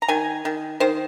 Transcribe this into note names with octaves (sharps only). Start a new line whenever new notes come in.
A#5
D#3 G#5
D#3
D#3 C5